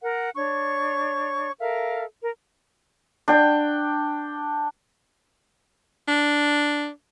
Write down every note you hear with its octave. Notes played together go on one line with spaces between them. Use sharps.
A#4 F#5
D4 C#5 C#6
A4 A#4 E5 F5
A#4
D4 G5
D4